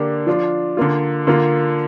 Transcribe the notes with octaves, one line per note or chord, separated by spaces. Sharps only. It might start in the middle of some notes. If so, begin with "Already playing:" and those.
Already playing: D3 A#3 D4 G4
F3 D4 F4
D3 A#3 F4
D3 A#3 F4